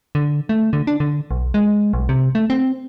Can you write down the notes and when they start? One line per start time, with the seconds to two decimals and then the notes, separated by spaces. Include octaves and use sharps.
0.15 D3
0.49 A3
0.73 D3
0.87 D4
1.00 D3
1.31 B1
1.54 G#3
1.93 B1
2.09 C3
2.35 A3
2.50 C4